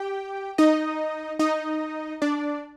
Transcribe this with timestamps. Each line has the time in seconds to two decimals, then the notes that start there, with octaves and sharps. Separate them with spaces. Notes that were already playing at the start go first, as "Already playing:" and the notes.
Already playing: G4 G5
0.58 D#4 D#5
1.39 D#4 D#5
2.22 D4 D5